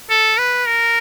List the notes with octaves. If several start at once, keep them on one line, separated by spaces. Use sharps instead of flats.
A4
B4
A#4